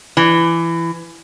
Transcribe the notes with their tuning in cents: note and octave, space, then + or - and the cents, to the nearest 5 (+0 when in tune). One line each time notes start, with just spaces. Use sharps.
E3 +20